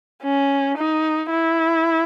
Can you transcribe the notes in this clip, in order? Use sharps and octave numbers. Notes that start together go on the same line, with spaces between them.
C#4
D#4
E4